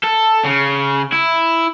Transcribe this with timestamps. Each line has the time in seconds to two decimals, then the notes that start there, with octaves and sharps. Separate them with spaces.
0.04 A4
0.44 C#3
1.12 E4